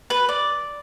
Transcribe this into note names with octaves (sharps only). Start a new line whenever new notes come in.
B4
D5